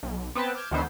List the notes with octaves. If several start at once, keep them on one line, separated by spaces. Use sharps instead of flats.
B1
B3 C4 B4 G5 A5
D6 F6 G6 G#6 E7
D2 D#3 E3 B3 C5 E6